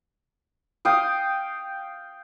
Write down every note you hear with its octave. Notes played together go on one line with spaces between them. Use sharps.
F5 G5 D#6